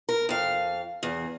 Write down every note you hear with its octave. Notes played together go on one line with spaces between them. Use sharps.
A#4
F2 F5
E2